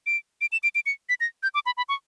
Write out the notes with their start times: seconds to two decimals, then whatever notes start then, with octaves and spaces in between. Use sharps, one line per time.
0.06 D7
0.41 D7
0.52 E7
0.63 D7
0.75 D7
0.86 C#7
1.09 B6
1.20 A#6
1.43 G6
1.54 D6
1.66 B5
1.77 B5
1.89 C#6